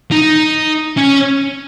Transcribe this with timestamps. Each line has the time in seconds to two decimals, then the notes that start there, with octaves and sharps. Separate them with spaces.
0.11 D#4
0.97 C#4